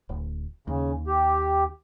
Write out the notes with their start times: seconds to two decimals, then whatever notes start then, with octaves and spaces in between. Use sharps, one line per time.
0.09 D1
0.67 D#2 C#3
1.07 G4